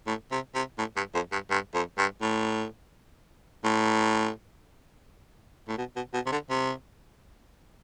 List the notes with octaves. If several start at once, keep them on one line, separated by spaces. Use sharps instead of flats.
A2
C3
C3
A2
G2
F2
G2
G2
F2
G2
A2
A2
A2
B2
B2
B2
C3
D3
C3